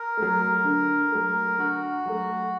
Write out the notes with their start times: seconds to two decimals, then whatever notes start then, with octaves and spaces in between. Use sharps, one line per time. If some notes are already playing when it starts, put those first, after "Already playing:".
Already playing: A#4
0.17 F#3 A3
0.64 D3
1.12 F#3 A3
1.58 D3 F#4
2.06 F#3 A3